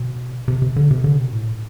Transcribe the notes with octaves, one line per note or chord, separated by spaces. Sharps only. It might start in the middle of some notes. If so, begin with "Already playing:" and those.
Already playing: B2
C3
C3
D3
C3
D3
C3
B2
A2